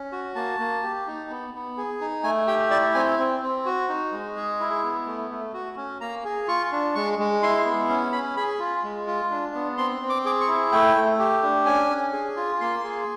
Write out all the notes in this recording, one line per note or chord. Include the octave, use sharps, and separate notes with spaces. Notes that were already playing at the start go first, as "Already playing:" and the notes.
Already playing: C#4
F#4
A#3 A5
A#3
G4
D#4
B3
B3
G#4
D#4
A3 G#5
G4 G5
E4 D5
C4 G#5
C4
C4
F#4
D#4
G#3
G#4
E4
B3
A3
A3
F#4
C#4
A#3 A#5
G#4
F4 C#6
D4
G#3 C#6
G#3
E4 C6
B3
C#4
C#4 B5
G#4 B5
F4
G#3
F4
D4
B3
C4 C6
C4
D6
G#4 D6
C#6
E4
A3 G5
A3
G4
D4
C#4 G#5
C#4
G#4
F4
A#3 C6
G#4